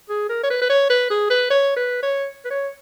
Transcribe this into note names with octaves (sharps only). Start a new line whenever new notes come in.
G#4
A#4
C#5
B4
B4
C#5
B4
G#4
B4
C#5
B4
C#5
B4
C#5